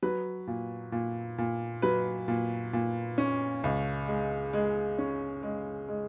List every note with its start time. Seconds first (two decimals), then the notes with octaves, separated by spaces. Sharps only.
0.03 F#3 B4
0.47 A#2
0.92 A#2
1.38 A#2
1.82 F#3 B4
2.28 A#2
2.73 A#2
3.18 C#4
3.64 C#2
4.08 G#3
4.53 G#3
4.98 C#4
5.43 G#3
5.88 G#3